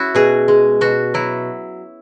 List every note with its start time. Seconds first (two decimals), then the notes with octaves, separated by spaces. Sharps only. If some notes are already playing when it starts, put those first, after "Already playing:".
Already playing: C#4 E4 F#4
0.15 B2 G#4
0.48 G#3
0.81 B2 F#4
1.14 F#3 E4